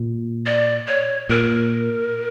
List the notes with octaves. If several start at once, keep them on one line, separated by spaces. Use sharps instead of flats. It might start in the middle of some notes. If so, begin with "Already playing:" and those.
Already playing: A#2
D5
C#5
A#2 A#4